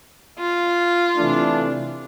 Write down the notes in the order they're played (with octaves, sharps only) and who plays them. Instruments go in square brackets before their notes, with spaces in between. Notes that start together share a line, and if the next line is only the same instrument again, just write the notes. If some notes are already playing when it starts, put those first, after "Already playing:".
[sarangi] F4
[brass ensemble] C3 E3 A3 D4